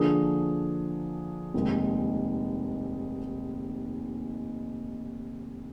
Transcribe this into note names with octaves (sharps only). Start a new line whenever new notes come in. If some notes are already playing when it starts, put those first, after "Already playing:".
Already playing: D3 F3 A#3 D4 G#4
F1 D#2 D#3 G#3